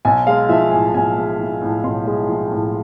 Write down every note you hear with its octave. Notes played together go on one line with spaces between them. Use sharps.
B1 G#5
G#3 F5
F3 E5
A2 G#5
B1 G#5
G#3
F3
A2
B1 C6
G#3
F3
A2